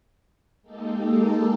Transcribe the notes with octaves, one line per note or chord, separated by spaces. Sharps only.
G#3 A#3 D#4 G4 A4